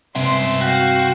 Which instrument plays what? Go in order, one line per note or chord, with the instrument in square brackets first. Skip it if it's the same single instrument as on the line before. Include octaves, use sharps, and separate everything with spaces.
[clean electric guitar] G2 C3 [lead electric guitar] G#3 E5 [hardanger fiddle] C6
[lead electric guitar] F#4 [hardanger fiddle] F5 [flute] G5